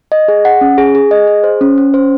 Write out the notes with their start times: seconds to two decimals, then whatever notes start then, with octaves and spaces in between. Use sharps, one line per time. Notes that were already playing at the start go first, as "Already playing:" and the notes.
0.12 D#5
0.28 G#4
0.45 F#5
0.61 C#4
0.78 G#4
0.95 G#4
1.11 D#5
1.27 G#4
1.44 C5
1.61 C#4
1.78 C#4
1.94 C5